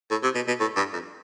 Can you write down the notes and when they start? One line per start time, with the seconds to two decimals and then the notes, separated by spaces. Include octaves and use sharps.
0.11 A2
0.23 C3
0.35 B2
0.47 B2
0.60 A2
0.76 G2
0.93 F2